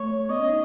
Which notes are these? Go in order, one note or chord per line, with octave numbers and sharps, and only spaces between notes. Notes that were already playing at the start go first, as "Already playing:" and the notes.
Already playing: A3 C#5
B3 D#5
C#4
D#4